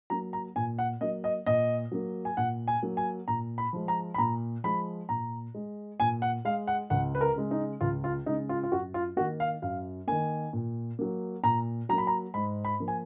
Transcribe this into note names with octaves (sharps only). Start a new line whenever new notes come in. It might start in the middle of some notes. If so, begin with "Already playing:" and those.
F#3 A#3 A#5
A#5
A#2 G#5
F#5
F#3 A#3 D#5
D#5
A#2 D#5
F#3 A#3
G#5
A#2 F#5
G#5
F#3 A#3
G#5
A#2 A#5
B5
F3 G#3
A#5
B5
A#2 A#5
F3 G#3 B5
A#2 A#5
G#3
A#2 G#5
F#5
G#3 F5
F#5
C#2 F#5
B4
A#4
C#3 G#3
D#4
C#2 F4
F4
C#3 G#3 D#4
F4
F4
F#2 F#4
F4
D#3 A#3 F#4
F5
F#2 F5
D#3 A#3 G#5
A#2
F#3 A#3
A#2 A#5
F#3 A#3 A#5
B5
A#5
G#2 B5
B5
F3 A#3
G#5